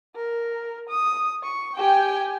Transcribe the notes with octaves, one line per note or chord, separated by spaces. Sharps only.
A#4
D#6
C#6
G4 G5 G#5